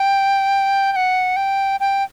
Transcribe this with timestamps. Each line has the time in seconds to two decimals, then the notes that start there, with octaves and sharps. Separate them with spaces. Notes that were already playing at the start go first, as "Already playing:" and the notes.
Already playing: G5
0.92 G5
0.96 F#5
1.36 G5
1.80 G5